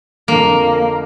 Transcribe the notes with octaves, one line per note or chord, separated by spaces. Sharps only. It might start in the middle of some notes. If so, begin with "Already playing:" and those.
F2 D3 A3 A#3